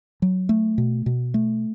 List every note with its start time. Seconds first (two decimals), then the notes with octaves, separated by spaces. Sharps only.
0.22 F#3
0.49 A3
0.78 B2
1.06 B2
1.34 A3